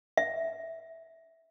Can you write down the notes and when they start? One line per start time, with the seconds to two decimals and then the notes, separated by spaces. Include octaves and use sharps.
0.17 E5